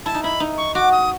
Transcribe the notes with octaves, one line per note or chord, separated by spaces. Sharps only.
E4 A5
D#4
E4 B5
D#4
C#6
F#4 D6
D#6